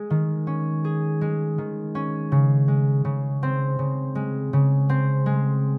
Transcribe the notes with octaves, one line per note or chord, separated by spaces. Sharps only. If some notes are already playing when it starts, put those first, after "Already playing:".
Already playing: G#3 G#4
D#3
C#4
G#4
G#3
D#3
C#4
C#3
G#3
C#3
C4
C#3
G#3
C#3
C4
G#3